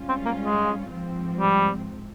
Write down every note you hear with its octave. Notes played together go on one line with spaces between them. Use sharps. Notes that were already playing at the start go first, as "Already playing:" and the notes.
Already playing: G#2 G3 C#4 F4
C4
A#3
G#3
G#2 F3 C4
G3